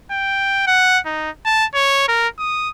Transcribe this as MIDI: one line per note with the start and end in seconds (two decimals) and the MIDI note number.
0.11 0.63 79
0.67 0.99 78
1.06 1.30 63
1.46 1.66 81
1.75 2.06 73
2.08 2.28 70
2.39 2.70 87